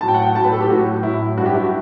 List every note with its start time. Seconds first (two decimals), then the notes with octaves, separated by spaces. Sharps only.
0.01 A2 F#3 A5
0.08 G5
0.14 F#5
0.22 G5
0.35 A2 F#3 A5
0.44 B4
0.52 A4
0.61 G4
0.69 A2 F#3 F#4
1.03 A2 F#3 E4
1.37 G2 F#3 F#4
1.46 G4
1.55 E4
1.63 F#4